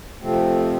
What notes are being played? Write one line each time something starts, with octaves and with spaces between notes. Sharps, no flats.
F2 C3 F3 A3 C4